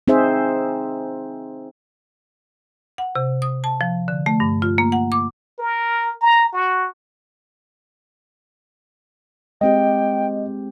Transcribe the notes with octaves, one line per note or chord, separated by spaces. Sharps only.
C4 D#4 G#4 C5 E5
F#5
C3
D#6
A5
F3
D3
A3
G2
F4
A#3
F#5
D6
A#4
A#5
F#4
G#3 C4 G4 D#5 G5